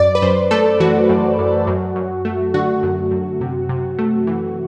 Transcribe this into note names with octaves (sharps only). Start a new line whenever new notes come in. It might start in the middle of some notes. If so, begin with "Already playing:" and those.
Already playing: F#2 D5
B4
F#2 C5
A3 A4
E3 F#4
F#2
F#2
F#2
F#2
A3
D3 F#4
F#2
F#2
C3
C3
A3
E3